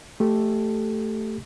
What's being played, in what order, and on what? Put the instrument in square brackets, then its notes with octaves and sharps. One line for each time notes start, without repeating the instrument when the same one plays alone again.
[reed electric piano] A3 G4 A4